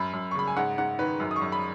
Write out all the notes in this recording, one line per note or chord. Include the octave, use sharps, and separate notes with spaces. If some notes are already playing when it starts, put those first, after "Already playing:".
Already playing: F#2 B5
F#2
C#6
C#3 B5
G#5
G#2 F#5
G#2 F#5
D#3 B4
F#2
D#6
C#6
F#2
B5